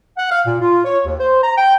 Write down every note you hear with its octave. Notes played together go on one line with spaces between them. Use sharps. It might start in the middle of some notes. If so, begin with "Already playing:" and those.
F#5
F5
A#2
F4
C#5
D#2
C5
A#5
G5